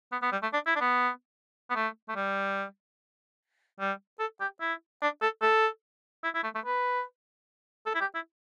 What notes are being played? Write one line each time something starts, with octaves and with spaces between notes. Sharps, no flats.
B3
B3
G3
A3
D4
E4
D4
B3
B3
A3
A3
G3
G3
A4
G4
E4
D4
A4
A4
E4
E4
A3
A3
B4
A4
E4
G4
E4